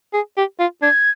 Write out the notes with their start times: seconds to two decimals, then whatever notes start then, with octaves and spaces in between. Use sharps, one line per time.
0.13 G#4
0.37 G4
0.59 F4
0.82 D4 G#6